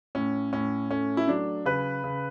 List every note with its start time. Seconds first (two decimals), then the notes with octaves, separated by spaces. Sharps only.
0.15 A2 C#4
0.53 A2 C#4
0.90 A3 C#4
1.17 E4
1.28 F#3 D4
1.65 C#3 B4
2.04 C#3